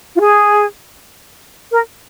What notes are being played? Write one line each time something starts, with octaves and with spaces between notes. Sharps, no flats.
F4
G#4
A#4